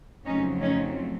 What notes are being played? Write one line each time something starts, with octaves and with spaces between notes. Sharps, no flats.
F2 C#3 F#3 A3 C4 C#4 D#4
C#4 D#4